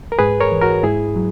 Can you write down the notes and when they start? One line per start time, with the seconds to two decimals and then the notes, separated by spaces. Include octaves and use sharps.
0.12 A#4
0.19 G#2 G#4 B4
0.40 A#4 C#5
0.52 E3
0.61 F#4 A#4
0.83 G#2 E4 G#4
1.16 F#3